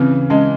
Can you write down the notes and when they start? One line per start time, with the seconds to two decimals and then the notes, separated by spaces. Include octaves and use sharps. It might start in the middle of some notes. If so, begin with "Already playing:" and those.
Already playing: C#3 E3 C4
0.30 G#3 C#4